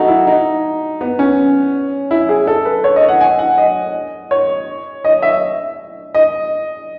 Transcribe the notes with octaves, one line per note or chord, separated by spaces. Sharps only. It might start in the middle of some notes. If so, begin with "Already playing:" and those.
Already playing: D#4 F#4 A4
E4
D#4
B3
C#4
E4
G#4
A4
B4
C#5
D#5
F#5
G#5
F#5
D#5
C#5
D#5
E5
D#5